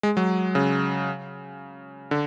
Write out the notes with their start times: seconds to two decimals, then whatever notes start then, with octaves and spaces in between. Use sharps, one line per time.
0.03 G#3
0.17 F#3
0.55 C#3
2.11 D3